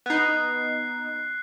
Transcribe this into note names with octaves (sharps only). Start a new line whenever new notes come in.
B3 D#4 F#6 C7